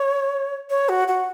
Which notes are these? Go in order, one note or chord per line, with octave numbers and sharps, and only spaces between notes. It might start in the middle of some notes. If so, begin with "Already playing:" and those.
Already playing: C#5
C#5
F#4
F#4